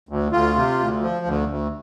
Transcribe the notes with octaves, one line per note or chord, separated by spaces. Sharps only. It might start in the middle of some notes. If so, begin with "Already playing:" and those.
D2
D2 F4
C3
D2
F3
D2
D2